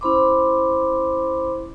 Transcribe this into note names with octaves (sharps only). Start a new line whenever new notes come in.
C#4 E4 C5 B5 C6 D6